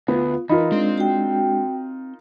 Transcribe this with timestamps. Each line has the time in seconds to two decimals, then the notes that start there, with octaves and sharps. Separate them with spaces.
0.08 D2 B3 F4
0.49 E3 D#4 F4 A#4 B5
0.72 G#3 C4 D4 C6
0.98 F#4 G5